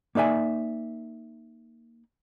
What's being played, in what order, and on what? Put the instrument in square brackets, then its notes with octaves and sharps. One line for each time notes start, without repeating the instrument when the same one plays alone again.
[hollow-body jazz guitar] A#3 D#4 D5 E5 G#5